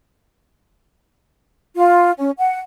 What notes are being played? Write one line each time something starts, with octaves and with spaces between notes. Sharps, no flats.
F4
C#4
F#5